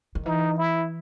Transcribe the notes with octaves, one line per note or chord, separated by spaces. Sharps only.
D#3
E3 D#4
E4